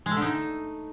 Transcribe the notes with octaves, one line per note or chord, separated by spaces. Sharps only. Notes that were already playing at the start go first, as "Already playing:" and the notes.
G#3
A3
D3
D#4